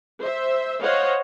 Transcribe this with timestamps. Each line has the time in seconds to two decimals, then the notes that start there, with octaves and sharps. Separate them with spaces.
0.21 C5 E5
0.82 C5 C#5 D#5 F5 F#5